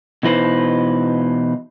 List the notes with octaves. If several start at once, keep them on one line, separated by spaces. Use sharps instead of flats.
B2 E3 D#4 B4 C5